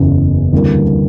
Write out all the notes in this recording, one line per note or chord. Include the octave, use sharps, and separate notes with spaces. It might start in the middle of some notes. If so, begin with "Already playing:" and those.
Already playing: F#1 E2 C#3
D2 C3 E3 G3 A#3